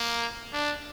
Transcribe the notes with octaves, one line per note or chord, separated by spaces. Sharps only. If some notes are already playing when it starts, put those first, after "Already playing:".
Already playing: A#3
D4